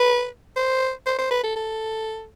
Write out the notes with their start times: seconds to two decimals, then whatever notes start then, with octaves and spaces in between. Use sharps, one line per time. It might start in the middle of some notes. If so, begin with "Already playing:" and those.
Already playing: B4
0.57 C5
1.06 C5
1.19 C5
1.31 B4
1.44 A4
1.56 A4